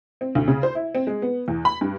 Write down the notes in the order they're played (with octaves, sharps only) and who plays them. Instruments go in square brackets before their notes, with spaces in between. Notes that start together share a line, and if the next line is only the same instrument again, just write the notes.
[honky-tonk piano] C4
D2
C#3
C5
E4
C4
G#3
B3
E2
B5
G2